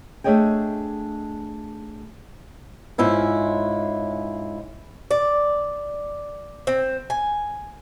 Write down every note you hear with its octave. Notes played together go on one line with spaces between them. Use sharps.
A3 D4 G#4 C#5 D#5 G5
G#2 C#4 E4 F4
D5
C4
G#5